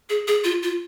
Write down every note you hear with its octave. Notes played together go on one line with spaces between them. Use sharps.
G#4
G#4
F4
F4